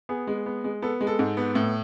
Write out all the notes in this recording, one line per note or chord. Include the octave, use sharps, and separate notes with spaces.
B3 G#4
G#3
B3
G#3
B3 A4
G#3
A4
G#2
B3
A2